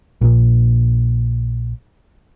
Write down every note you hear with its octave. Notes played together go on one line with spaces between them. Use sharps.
A#1 A#2